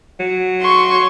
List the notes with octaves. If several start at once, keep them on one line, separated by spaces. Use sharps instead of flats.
F#3
C6 C#6